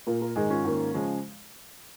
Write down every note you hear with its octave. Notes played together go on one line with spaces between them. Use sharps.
A#2 A#3 F4 A#4
F4 A#4
G#2 D#3 G#3 D#4 G#4
C#4 F4
G#2 D#3 A#3
C#3 F3 G#3